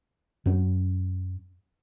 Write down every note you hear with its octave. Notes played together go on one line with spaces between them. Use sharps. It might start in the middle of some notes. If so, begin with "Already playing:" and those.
F#2 C#4